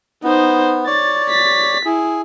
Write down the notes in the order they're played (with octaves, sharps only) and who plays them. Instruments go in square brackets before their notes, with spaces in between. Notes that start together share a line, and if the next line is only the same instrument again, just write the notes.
[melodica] B3 [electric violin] D#4 C5
[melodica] C#5 D5 [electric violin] A6
[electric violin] A6 B6
[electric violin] E4 [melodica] G#4